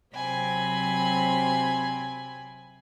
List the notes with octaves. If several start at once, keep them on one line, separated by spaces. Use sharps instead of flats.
C3 F#3 C4 G#5 B5